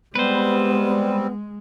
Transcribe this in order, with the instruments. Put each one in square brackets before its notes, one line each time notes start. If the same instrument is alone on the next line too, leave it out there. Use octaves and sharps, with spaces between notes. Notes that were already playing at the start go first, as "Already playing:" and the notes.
[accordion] G3 C4 [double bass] G#3 [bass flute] B3 [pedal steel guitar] B4 C5